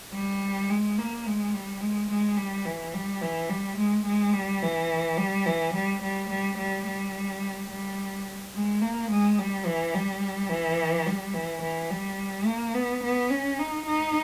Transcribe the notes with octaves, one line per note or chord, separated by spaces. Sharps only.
G3
G#3
A#3
G#3
G3
G#3
G#3
G3
E3
G3
E3
G3
G#3
G#3
G3
E3
G3
E3
G3
G3
G3
G3
G3
G3
G#3
A#3
G#3
G3
E3
G3
E3
G3
E3
E3
G3
A#3
B3
B3
C#4
D#4
D#4